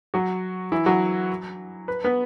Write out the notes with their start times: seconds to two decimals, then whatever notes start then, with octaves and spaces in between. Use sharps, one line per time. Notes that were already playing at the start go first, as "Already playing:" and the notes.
0.14 F#3 F#4
0.72 E3 E4
0.86 F#3 F#4
1.88 B4
2.04 B3 B4